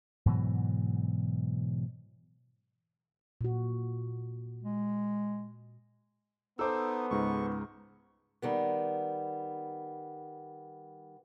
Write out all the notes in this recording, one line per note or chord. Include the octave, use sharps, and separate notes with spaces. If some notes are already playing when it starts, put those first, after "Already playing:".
G#2 B2 E3 F#3
A#2 F#4
G#3
B3 D#4 A4 C5 D6 E6
C#2 G#2 A#5 C#6
D#3 G3 B3